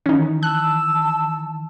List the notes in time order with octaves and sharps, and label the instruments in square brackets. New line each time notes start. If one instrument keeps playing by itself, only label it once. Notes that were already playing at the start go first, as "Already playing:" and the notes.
[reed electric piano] D#3 E3 [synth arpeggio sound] C#4 D#4
[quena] A5 [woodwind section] E6 [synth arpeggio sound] F#6